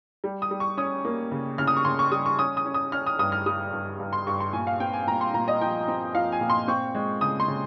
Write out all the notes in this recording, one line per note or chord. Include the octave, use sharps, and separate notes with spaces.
G3
D#6
G3
C#6
C#4 D#6
A#3
C#3
C#3 F6
D#6
C#6
C#3 C6
C#6
G3 D#6
C#6
C#4 D#6
D#6
C#4
D#6
C#4 F6
D#6
G2 D#6
F6
G3 D#6
G2
G2
C6
G2 C#6
C6
A#2 G#5
F5
C4 G5
G#5
A#2 A#5
C6
A#2 A#5
D#5
F3 G5
C4
F3 F5
G#5
A#2
C6
C4 C#6
G#3
C#3 D#6
C6
C#3